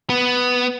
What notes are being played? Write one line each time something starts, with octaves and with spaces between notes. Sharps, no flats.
B3